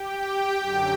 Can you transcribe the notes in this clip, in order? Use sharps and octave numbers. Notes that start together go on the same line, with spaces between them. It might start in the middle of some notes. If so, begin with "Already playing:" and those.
Already playing: G4 G5
F#2 D3 F#3